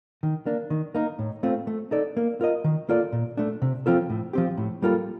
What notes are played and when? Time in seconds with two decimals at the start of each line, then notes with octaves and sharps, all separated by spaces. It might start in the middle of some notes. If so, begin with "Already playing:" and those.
0.23 D#3
0.46 A#3 D4
0.70 D#3
0.95 A#3 D#4 A#4
1.19 A2
1.43 A3 C4 F4
1.67 A3
1.91 D#4 A4 D5
2.17 A#3
2.41 F4 A#4 D#5
2.64 D#3
2.89 A#3 F4 A4 D5
3.12 A#2
3.37 A3 D4
3.62 C3
3.86 F3 C4 F4 A4
4.10 A2
4.33 F3 C4 G4
4.58 A2
4.82 G3 A#3 F4 A4